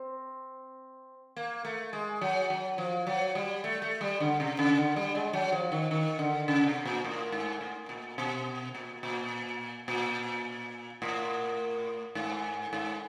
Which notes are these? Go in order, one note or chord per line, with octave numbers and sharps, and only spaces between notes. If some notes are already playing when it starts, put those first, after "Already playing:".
Already playing: C4
A#3
A3
G#3
F#3
F#3
F3
F#3
G3
A3
A3
G3
D3
C3
C#3
D3
G3
G#3
F#3
F3
D#3
D#3
D3
C#3
C3
A#2
A2
G#2
A2
A#2
B2
A#2
A#2
A#2
A2
G#2
G#2